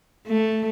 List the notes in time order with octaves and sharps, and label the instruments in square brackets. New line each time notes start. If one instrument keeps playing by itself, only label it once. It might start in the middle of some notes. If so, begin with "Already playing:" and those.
[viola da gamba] A3